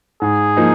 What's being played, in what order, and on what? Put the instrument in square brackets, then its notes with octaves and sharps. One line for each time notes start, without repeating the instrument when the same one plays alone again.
[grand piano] G#2 [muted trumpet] G#4
[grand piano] F3 A#3 D#4